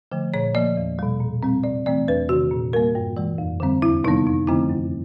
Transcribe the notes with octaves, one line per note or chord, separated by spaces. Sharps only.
D3 F3 A3
A#2 C#5
F3 A#3 D5
E2
B2 G3
A#2
G3 C4
C3 D5
E3 A3 C4 D5
E2 B4
C3 D#3 F#4
A#2
G3 A#3 A#4
G2
E3 G#3
F2
D3 G3 C4
E2 E4
C3 D#3 G3 B3 D#4
F2 D#4
D3 F3 A3 C4 E4
F#2